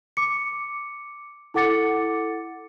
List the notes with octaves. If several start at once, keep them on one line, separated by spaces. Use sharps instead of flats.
D6 C#7
E4 A4 F#5 D6 A6 C#7